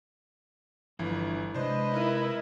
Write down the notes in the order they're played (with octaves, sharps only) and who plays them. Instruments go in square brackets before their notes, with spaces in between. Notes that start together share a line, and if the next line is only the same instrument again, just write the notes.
[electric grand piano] G1 E3 E4 [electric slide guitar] F3 D4 A#5
[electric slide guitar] C3 G#3 [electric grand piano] D4 C5 [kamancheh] B4 D#5
[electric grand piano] D#4 A#4 [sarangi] E4